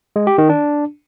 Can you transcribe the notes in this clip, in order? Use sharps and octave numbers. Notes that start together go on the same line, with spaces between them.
G#3
G4
D#3
D4